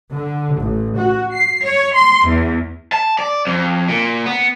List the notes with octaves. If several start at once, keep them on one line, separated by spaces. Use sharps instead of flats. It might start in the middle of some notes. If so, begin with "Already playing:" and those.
D3
A1
F#4
C7
C#5
C6
E2
A5
D5
F2
A#2
B3